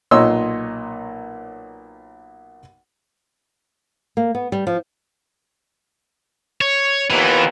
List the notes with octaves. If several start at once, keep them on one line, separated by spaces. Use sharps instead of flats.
B1 A#2 C#5 D#5 C6 E6
A#3
B3
G3
F3
C#5
D#2 A#2 E3 B3